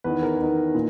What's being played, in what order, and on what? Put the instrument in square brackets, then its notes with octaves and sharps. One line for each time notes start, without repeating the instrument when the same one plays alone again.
[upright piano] E2 D#3 B4
A#4
E2 D#3
A#2